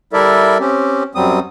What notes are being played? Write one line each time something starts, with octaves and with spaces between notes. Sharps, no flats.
G3 E4 A4 A#4 D5 E5
C4 C#4 G4
F#2 F#3 G3 C4 D#6